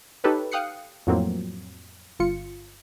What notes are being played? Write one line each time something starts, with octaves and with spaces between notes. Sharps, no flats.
D#4 G4 A4 B4 C#5
F5 G5 D#6 F#6 C7 C#7
F2 A2 F#3 A#3 C4
G1 F4 C#7